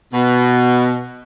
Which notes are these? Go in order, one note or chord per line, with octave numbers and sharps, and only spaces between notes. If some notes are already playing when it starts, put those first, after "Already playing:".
B2